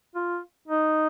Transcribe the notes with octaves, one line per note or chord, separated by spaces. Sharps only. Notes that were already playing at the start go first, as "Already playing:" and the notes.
F4
D#4